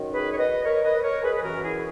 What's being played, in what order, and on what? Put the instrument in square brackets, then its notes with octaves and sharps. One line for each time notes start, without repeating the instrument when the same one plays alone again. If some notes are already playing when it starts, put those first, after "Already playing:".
Already playing: [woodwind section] F#2 D#3
G#4 B4
C#5
B4 D#5
A#4 C#5
B4 D#5
B4
A#4 C#5
G#4 B4
B4
F#2 E3 F#4 A#4
E4 G#4